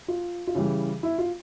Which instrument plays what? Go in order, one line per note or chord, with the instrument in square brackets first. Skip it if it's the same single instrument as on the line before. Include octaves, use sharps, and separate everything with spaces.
[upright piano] F4
F4
[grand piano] C#3 E3 G3 [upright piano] E4
[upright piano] E4
F4